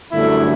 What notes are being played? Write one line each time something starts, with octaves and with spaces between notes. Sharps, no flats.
G1 F#2 D3 A3 E4